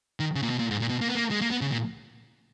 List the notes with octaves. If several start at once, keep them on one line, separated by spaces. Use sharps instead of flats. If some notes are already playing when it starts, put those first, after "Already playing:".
D#3
C#3
A#2
B2
A#2
G#2
A#2
B2
A#3
B3
A#3
G#3
A#3
B3
C#3
A#2